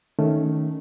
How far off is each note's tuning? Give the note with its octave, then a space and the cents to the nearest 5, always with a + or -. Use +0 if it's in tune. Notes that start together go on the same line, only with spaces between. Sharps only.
D#3 +0 A3 +0 C#4 +5